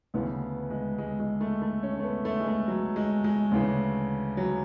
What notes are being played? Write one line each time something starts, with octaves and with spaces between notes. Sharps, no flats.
D2 C#3 E3 B3
G#3
G#3
G#3
A3
A3
C#4
A3
B3
A3
G#3
A3
F#3
G#3
G#3
D2 C#3 E3
F#3